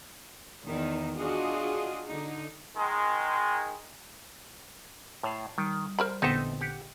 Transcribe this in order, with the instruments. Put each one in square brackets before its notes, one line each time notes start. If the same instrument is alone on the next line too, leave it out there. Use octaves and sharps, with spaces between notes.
[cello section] E2 D#3
D4 F4 F#4 G#4 D#5
D3 D#4
[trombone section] D#3 G#3
[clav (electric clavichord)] A2 [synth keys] C#5 A5 C7
[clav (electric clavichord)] D#3 [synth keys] G3
[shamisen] A#4 C5 B5 [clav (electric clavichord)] D5
[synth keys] A1 A#2 D3 [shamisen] B3 C4 [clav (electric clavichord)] D#4 A4 E5
[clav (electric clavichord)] G4 F#5